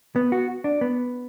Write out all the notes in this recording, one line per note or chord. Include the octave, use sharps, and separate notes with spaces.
B3
F#4
D4
B3